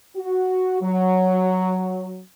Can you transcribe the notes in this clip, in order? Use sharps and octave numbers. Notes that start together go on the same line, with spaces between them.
F#4
F#3